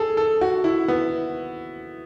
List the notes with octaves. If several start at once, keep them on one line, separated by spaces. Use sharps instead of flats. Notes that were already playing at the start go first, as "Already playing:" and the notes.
Already playing: G#4 A4
A4
F#4
E4
B3